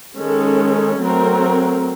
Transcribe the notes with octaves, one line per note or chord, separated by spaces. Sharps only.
D#3 G#3 C#4 A4
F#3 A3 C4 A#4